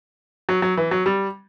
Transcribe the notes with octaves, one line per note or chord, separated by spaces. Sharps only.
F#3
F#3
E3
F#3
G3